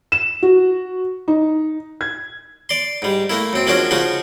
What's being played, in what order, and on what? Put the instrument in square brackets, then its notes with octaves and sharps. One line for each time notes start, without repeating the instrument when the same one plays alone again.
[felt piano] E7
F#4
D#4
G#6
[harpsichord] D5 C6
G#2 G3
A3 A#3 E4
F#2 C4
F3 G#3 A#3 C#4 D4 F#4
C#3 F3 G#3 D#4 F#4